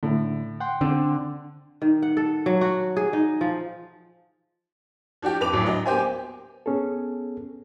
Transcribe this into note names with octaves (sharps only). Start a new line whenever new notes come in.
A2 D3
F#5 G5 C6
D3 C4
D#3
F#5
A4
F#3
F#4
G#4
D#4
F3
F3 D4 F#4 G4
F2 B4 D6 F7
D2 A2 F#3
F#3 D4 D#5
A#3 B3 G4 C5 G#5
B3 C#4 G#4 A4